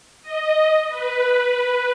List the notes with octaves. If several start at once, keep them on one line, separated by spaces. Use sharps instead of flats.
D#5
B4